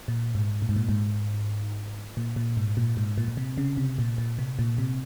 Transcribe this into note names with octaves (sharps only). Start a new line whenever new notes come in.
A#2
G#2
A#2
G#2
A#2
G#2
A#2
A#2
G#2
A#2
G#2
A#2
A#2
C3
C#3
C3
A#2
A#2
C3
A#2
C3